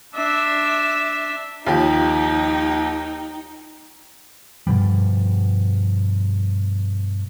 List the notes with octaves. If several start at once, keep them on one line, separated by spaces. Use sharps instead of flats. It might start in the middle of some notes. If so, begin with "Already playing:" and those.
D4 E5
D#2 F3 D#4 G4 G5
G2 B2 F3 G3